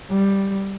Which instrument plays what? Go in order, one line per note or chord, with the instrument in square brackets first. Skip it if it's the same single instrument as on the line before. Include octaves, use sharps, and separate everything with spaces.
[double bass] G3